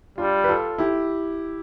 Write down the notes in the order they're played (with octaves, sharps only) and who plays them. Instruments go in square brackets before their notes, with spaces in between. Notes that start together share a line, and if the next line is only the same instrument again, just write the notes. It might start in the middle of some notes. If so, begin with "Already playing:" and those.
[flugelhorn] G3 [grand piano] D4 F4
[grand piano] B4
F4 A4
E4 G4